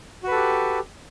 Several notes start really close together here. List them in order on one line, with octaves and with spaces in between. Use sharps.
F#4 B4 A4 G4